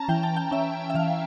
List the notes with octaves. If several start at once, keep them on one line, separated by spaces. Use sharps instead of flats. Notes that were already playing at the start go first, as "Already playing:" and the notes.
Already playing: C#4 A5 A#5
E3 G5
A5
G5
C#4 E5
E5
E3 F5